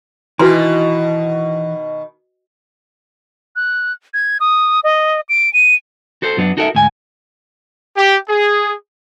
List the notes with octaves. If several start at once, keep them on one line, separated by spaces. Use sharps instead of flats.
B2 D#3 E3 F#4 B4 C6
F#6
G#6
D#6
D#5
D7
D#7
F#4 A4 C5
F#2 F#3 B3 D4
D#4 F#4 A4 A#4 D5 E5
D2 G#2 G#5
G4
G#4